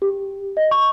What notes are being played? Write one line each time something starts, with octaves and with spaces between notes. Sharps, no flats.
G4
D#5
C#6